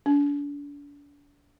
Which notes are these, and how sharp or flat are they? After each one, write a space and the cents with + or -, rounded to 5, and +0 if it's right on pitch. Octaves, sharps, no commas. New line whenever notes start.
D4 -35